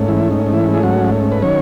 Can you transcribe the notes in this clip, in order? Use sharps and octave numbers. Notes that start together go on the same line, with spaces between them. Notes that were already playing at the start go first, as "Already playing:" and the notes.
Already playing: G#2 A3 C#4
E3 E4
D#4
D#4
E3 E4
G#4
F#3 F#4
B4
D#3 F#3 C#4 C#5